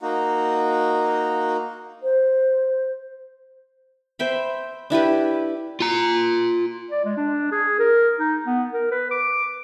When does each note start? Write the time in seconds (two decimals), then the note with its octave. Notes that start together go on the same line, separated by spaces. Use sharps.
0.01 A#3 D#4 F#4
2.02 C5
4.19 C5 E5 G5 B5
4.90 D4 E4 G4 B4
5.80 F4 A#5
6.91 D5
7.05 G#3
7.17 D4
7.52 G#4
7.79 A#4
8.20 D#4
8.46 B3
8.73 A#4
8.91 B4
9.11 D6